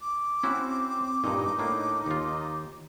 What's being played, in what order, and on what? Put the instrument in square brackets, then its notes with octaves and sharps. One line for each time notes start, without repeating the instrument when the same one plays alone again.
[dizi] D6
[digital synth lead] C4 [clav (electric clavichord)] C#4 E4 F#4
[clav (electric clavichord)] G2 A#2 [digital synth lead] D#4
[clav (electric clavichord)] A2 A#3 D4
D#2 F4